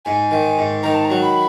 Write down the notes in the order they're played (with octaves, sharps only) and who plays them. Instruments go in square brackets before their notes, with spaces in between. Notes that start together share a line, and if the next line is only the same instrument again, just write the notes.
[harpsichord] G#2 [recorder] G#5
[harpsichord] D#3
G#2
[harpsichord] D#3 [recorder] A#5
[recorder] A5
A#5
[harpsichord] F#3
[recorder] B5